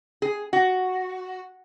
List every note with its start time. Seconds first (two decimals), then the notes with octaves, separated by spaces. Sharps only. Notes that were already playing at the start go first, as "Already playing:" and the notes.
0.22 G#4
0.53 F#4